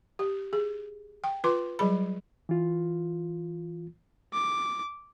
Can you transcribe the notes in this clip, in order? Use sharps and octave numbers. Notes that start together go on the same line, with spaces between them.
G4
G#4
G5
F4 B4 C6 D6
F#3 G3 G#4 B5
E3 F4
D6